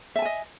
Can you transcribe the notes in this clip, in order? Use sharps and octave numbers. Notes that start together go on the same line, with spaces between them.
D#5 E5 G#5 A5